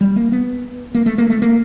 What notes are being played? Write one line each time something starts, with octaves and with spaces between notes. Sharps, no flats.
G3
A#3
B3
A#3
A3
A#3
A3
A#3